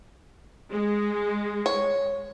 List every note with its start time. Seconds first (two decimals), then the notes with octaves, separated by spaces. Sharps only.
0.72 G#3
1.66 C#5